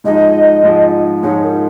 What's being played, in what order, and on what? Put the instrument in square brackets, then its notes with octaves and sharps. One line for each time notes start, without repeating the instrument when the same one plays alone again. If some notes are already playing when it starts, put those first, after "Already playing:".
[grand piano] G#2 F3 G#3 D#4 [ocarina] D#5
[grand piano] G#2 F3 G#3 D#4
[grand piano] G#2 F3 G#3 D#4 [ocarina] C#5
[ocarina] A#4